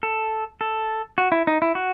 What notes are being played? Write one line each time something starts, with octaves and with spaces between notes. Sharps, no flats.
A4
A4
F#4
E4
D#4
E4
F#4